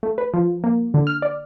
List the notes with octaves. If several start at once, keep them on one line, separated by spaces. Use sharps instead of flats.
A3
B4
F3
A#3
D3
F6
D5